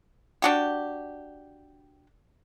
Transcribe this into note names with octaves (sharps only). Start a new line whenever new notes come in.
D4 F#4 G4